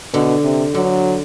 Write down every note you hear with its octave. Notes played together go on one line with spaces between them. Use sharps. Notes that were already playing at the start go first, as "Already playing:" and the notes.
B2 D3
C3
D3 F#3